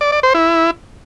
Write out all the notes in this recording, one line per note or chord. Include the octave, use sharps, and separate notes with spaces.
D5
D5
C5
E4